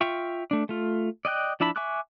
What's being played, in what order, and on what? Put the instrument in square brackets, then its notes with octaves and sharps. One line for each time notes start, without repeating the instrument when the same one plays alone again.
[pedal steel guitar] F4 E5 G5 C#6
A3 D4
A3 F4
D5 D#5 G5 F#6
F3 D4 E4 A5 B5
E5 G#5 C#6 D6 F#6